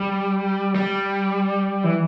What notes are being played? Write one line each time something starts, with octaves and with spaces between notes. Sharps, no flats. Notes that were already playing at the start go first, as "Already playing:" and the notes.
Already playing: G3
G3
E3